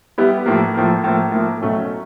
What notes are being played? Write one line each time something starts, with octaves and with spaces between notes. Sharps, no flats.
G3 B3 E4 G4
A2 F3 A#3
A2 F3 A#3
A2 F3 A#3
A2 F3 A#3
B2 F#3 A3 C#4